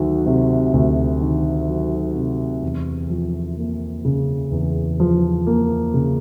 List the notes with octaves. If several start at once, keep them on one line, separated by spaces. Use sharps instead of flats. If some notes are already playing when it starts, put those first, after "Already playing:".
Already playing: D2 D#3 F#3
C3
D2
D#3
F#3
C3
E2
F3
A#3
C#3
E2
F3
A#3
C#3